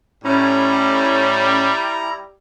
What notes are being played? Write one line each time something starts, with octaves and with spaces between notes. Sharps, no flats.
A2 G3 C#4 E4 A#5